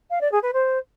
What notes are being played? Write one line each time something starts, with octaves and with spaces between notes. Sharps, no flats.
F5
D5
G#4
B4
C5